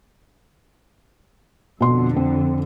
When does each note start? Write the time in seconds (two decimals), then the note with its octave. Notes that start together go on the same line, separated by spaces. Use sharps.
1.80 F2 B2 D3 C6
2.16 C4